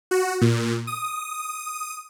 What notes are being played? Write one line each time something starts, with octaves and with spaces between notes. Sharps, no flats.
F#4
A#2
D#6